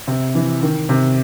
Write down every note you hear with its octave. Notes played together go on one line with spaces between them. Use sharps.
C3
E3
D#3
C3